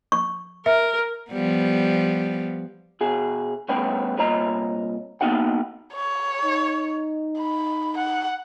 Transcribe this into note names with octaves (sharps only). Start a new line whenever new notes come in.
C#6
A#4 E5
F3 G3 B3
B2 F#4 G#4
G2 A3 B3 C#4 C#5 G5
C2 A#2 C#5 D#5 A#5
A#3 B3 D#4 F#4 F#5 G5
C#5
D#4
B5
F#5